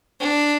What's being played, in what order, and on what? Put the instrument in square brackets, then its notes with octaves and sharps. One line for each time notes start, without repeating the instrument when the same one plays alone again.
[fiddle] D4